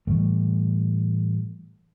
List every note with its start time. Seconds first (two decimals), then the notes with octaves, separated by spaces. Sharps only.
0.07 A2 E3 G3 A3